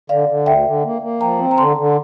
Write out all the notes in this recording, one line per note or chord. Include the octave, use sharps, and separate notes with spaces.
D3 D5 F5
D3
D2 E5 G5
D3
A#3
A#3
F3 G5 A#5
C4
A#5
D3 A5 C6
D3